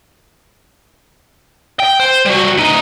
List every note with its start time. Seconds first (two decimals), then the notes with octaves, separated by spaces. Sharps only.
1.80 G5
2.00 C5
2.25 G3 F#4
2.58 D2 D#4